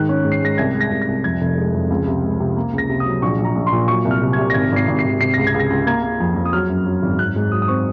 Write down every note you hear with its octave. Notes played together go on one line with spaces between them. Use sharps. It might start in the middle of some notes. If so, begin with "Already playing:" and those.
Already playing: G#2 D#3 F#6
C#4
G#2
C7
G#3 A#6
C2 G#6
G#3
A#6
C2
A#6
C2
F2 G#6
F1
G#3
F2
C#2
C3
G#3
C3
A#3
C#2
A#6
C3
D#6
F#3
A#1 C#6
A#1
A#5
A#1
C6
A#2
F#3 C#6
C2
F6
C3
G#6
C3
A#6
G#1 G#6
G#1 C7
G#1
C7
G#1
C3 C7
C#2 A#6
G#6
C#2
A#6
C#2
A#3 G#6
A#3
F2
F2
D#6
F#3 F6
F#2
F#3
G#1
G#1 F#6
G#2
F#3 D#6
D#6
C4 C#6